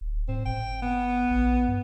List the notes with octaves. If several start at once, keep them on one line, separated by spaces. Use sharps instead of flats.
D1
A2 C4
G1 G5
B3
A#1
G2